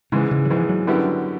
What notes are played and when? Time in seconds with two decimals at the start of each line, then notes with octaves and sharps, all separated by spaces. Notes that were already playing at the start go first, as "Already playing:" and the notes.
0.12 G#2 C#3 E3 G#3
0.31 C#3
0.45 F#3
0.50 G#2 E3 F3 G#3
0.69 F#3
0.87 F#2 D3 G3 B3 E4